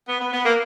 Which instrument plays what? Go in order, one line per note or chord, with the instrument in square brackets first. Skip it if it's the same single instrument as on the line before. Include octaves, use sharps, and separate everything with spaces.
[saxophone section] B3
B3
B3
A#3